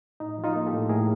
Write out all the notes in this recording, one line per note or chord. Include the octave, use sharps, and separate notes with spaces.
A2 D#4
F3
D#4 F4
A#3
G4 A4
A2
A2 G#4 A#4